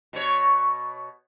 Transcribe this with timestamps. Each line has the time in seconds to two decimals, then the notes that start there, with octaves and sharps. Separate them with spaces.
0.13 B2 C#5